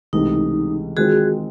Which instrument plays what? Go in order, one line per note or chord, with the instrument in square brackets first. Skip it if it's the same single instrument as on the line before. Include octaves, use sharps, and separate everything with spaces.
[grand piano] C#2 C3 E3 A3 [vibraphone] D#4
[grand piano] D#3 G#3 C4 F4 [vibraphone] F#4 G#4